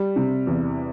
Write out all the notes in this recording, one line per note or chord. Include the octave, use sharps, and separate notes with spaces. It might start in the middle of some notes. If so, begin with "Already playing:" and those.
Already playing: G3
C3
E2